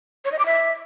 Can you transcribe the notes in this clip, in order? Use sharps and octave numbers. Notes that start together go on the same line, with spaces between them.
C#5
D#5
D6
E5